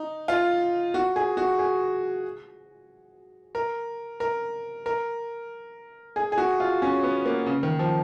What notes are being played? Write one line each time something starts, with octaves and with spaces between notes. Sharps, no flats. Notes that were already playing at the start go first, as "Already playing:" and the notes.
Already playing: D#4
F4
F#4
G#4
F#4
G#4
A#4
A#4
A#4
G#4
G#4
F#4
F4
C#4
B3
A#3
C#3
D#3
F3